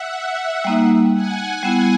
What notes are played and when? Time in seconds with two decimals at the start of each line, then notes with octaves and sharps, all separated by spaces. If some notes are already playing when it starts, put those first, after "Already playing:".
Already playing: E5 F#5
0.16 E5 F#5
0.65 G3 A#3 D#4
1.13 F#5 G#5
1.63 G3 B3 E4 F#5 G#5